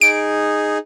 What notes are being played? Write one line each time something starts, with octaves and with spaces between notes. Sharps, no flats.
D#4 G#4 D7